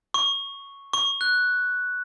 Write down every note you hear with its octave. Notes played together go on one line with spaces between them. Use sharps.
C#6
C#6
F#6